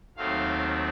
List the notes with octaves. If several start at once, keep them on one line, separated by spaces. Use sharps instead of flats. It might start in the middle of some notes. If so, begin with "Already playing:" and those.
D#2 D#3 F#3 A3 C4 F5